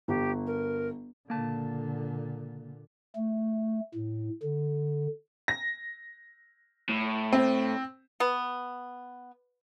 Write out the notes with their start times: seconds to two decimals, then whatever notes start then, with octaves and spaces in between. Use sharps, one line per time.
0.08 G1 G4
0.46 A#4
1.29 C#2 A#2 D3 A#3 A5
3.16 A3
3.94 A2
4.43 D3
5.48 A#6
6.89 A2
7.33 C4
8.20 B3